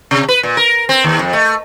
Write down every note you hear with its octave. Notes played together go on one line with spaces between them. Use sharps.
C3
B4
A#2
A#4
C4
D#2
F2
A3